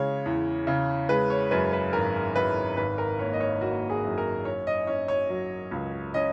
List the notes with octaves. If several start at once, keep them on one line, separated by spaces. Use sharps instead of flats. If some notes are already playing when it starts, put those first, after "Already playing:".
Already playing: C#3 G#3 C#5
E2
C#3
G#3 B4
C#5
F#2 B4
B4
G#1 A#4
F#2 B4
G#1 B4
A#4
A#3 C#5
D#5
C#5
A#3 F#4
G#4
F#2
A#4
C#4 C#5
D#5
C#4 C#5
C#5
F#3
C#2
C#4 D#5